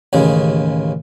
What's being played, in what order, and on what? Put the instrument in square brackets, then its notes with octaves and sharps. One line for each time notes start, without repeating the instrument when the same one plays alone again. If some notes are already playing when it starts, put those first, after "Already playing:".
[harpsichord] A1 D#2 C#3